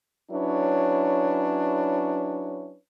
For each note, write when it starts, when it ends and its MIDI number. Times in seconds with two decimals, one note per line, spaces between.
0.31 2.76 54
0.31 2.76 61
0.31 2.76 62
0.31 2.76 64
0.31 2.76 71
0.31 2.76 73